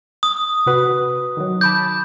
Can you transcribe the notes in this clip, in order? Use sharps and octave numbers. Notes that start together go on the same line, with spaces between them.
D#6
C3 F#4 B4
D#3 F#3
A5 B5 D6 G6